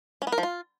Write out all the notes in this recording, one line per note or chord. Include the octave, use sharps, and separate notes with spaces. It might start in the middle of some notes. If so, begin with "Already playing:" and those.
C#4
B3
A#4
F3
F4